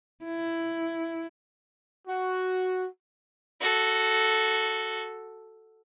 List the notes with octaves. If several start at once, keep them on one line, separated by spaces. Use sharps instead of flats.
E4
F#4
F#4 A4